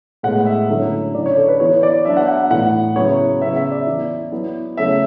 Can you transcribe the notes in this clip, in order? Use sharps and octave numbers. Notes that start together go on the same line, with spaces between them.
A2 G#3 B3 F#5
E5
D3 F#3 A3 C#4 E4
D3 F#3 C#4 E4 D5
C#5
A4
B4
E3 B3 E4 C#5
D5
F#3 B3 D4 E5
F#5
F#5
A2 E3 B3 F#5
C#3 F#3 B3 E4 C#5
C#3 F#3 B3 E5
E5
D5
E3 B3 E4
F#3 B3 E4
C#3 F#3 A3 C#4 E5